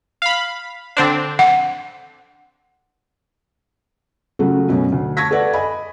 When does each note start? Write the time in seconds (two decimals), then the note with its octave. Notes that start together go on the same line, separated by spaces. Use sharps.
0.22 F5 B5
0.97 D3 C4 D4
1.39 F#5
4.39 C#3 F#3 A3 F4 F#4
4.69 F#2 B2 C#4
4.92 D2
5.17 A5 C#6 G#6 A#6 B6
5.31 A4 B4 D5 F#5
5.53 D#5 G#5 B5